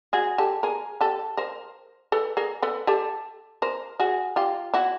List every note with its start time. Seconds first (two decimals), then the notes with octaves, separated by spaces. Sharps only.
0.13 F#4 G#4
0.38 G4 A4
0.63 G#4 A#4
1.01 G4 A4
1.37 A#4 C5
2.12 A4 B4
2.37 G#4 A#4
2.62 A4 B4
2.87 G4 A4
3.62 A#4 C5
3.99 F#4 G#4
4.36 F4 G4
4.74 E4 F#4